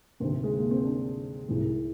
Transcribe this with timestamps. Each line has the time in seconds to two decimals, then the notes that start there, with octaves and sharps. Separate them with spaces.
0.20 D2 C3 D#3 C4
0.43 G#3
0.57 A#3
0.71 C4
0.85 D4
1.48 C2 C3 D#3 G#3